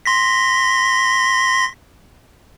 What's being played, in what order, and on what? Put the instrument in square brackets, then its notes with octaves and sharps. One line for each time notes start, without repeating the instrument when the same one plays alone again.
[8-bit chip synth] C6 A#6 B6